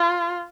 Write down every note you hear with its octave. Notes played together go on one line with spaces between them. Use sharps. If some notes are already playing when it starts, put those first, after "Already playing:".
Already playing: F4